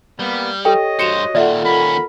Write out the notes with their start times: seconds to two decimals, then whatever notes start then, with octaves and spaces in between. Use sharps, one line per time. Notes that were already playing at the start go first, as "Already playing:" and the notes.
0.19 G3 A#3 B3
0.65 G4 A4 C#5 D#5 G5
0.99 G2 F#4 C5 C#7 E7 F7
1.35 D#2 A#2 F4 A4 D5 E5 F#5
1.64 D#2 C#4 A#4 B5